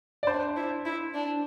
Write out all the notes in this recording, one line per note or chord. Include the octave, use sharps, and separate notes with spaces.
D5
D4 C5
E4
E4
D4